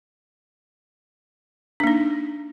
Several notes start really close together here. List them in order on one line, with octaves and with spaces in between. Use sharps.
D4 A#3 D#4